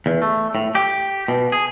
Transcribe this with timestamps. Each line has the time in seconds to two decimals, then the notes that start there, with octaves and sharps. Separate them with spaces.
0.06 E2
0.22 A3
0.55 A2
0.75 G4
1.28 B2
1.52 G#4